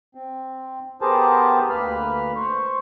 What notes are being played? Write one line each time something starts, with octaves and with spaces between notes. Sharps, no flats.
C4
B3 G4 G#4 A#4 C5 A5
D2 A#3 B4 B5 F6
C5 C#6